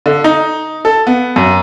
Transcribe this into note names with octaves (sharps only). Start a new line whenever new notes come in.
D3
D#4
A4
B3
F#2